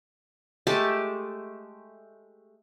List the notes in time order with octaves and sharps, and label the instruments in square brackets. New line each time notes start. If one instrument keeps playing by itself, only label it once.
[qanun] G#3 A3 G4 A5